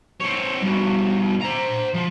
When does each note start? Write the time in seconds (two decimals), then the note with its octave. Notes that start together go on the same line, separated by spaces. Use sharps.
0.21 C4 C#5
0.62 G2 B2
1.41 C5 A#5
1.94 F3